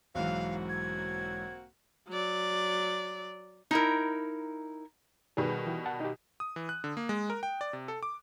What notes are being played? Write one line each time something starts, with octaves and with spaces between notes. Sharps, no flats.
B1 G#2 E3 A#3 C4 F#4 F5
G#6
F#3 D5
D#4 E4 A#4
B2 D#3 G3 G#4 B4
E3
F#5 A5
D#4 G4
D#6
E3
F#6
D3
A#3
G#3
A#4
G5
D5
C3
A4
D6